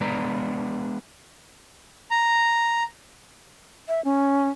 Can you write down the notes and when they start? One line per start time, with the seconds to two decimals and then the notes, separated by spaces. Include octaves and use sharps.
0.01 G#3 B3 D4 B4 D5 A#5
2.11 A#5
3.88 E5
4.04 C#4